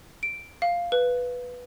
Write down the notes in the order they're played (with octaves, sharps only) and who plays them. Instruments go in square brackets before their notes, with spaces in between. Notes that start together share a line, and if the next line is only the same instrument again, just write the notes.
[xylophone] D7
F5
B4